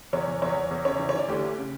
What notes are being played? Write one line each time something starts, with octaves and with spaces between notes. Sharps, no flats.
E2 C#5
E2
E2 C#5
E2
E2
C#3 C#5
E3
C#5
E3 D5
D2 G4
A3
C#3